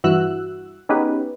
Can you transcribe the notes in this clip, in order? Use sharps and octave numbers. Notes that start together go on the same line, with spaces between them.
G2 E3 E4 F#4 E6 F#6
B3 C#4 D#4 G4 G#4 B4